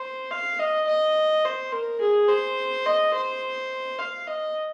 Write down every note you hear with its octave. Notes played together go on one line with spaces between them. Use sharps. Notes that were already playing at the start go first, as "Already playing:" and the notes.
Already playing: C5
F5
D#5
D#5
C5
A#4
G#4
C5
D#5
C5
F5
D#5